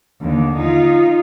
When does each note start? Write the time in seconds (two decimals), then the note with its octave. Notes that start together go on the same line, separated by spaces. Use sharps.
0.22 D#2 D3
0.57 D#4 F4